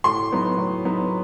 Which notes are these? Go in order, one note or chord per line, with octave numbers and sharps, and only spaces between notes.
A2 C6
F#3 B3 D#4
A2
F#3 B3 D#4